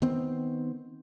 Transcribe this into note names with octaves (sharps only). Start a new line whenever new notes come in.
D#3 B3 C4